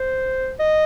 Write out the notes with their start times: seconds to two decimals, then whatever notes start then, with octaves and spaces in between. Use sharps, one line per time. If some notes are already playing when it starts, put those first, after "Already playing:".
Already playing: C5
0.59 D#5